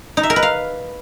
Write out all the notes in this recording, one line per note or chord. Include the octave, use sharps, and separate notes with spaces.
D#4
E5
A#4
B4
F5